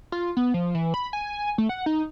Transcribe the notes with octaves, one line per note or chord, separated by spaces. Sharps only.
F4
B3
F3
E3
B5
G#5
A3
F#5
D#4